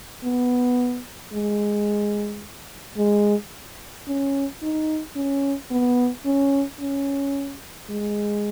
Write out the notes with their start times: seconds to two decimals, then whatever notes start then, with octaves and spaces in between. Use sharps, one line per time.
0.24 B3
1.33 G#3
2.97 G#3
4.08 C#4
4.62 D#4
5.16 C#4
5.71 B3
6.25 C#4
6.80 C#4
7.90 G#3